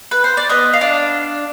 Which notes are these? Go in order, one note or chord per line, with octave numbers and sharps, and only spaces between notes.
B4
C5
D5
B3 D#5
F5
D4